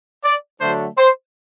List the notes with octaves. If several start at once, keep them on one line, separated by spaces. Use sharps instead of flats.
D5
D3 F#3 A3 D4 C5
C5